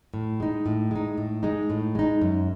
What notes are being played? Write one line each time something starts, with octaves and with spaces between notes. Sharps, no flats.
A2
G#3 D#4
A2
G#3 D#4
A2
G#3 D#4
A2
G#3 D#4
F#2